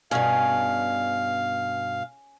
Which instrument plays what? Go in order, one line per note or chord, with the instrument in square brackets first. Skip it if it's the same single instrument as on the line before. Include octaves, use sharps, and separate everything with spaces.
[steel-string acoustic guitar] G2 B2 [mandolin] C#4 G#4 [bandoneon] F5